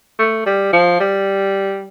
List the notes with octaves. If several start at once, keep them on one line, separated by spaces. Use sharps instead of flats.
A3
G3
F3
G3